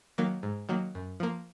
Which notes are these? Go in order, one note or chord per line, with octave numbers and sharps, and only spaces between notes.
D#3 F#3 A#3
G#2
D#3 F#3 A#3
F#2
F3 A#3